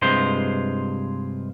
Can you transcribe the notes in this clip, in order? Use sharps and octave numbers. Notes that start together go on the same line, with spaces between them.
G2 C3 G#3 F4 C5